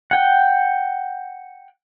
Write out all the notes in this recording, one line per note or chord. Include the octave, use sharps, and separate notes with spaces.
F#5 G5